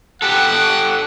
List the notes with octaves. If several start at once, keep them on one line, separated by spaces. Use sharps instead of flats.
G4 A4 F#5